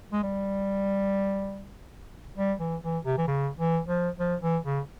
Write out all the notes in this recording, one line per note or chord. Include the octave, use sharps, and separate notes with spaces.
G#3
G3
G3
E3
E3
C3
E3
C#3
E3
F3
F3
E3
C#3